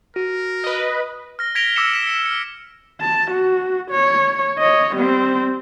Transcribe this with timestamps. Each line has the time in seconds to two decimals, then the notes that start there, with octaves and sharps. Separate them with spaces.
0.16 F#4 A#4
0.64 B4 D#5
1.39 F6 A#6
1.55 G#6 A#6 B6 D7 F7 G7
1.76 D6 E6 A#6 B6 C#7 E7
1.93 B6 E7
2.07 C#7 E7
2.26 F6 C#7
3.01 A5
3.31 F#4
3.91 C#5
4.59 C#5 D#5
4.95 G3 C4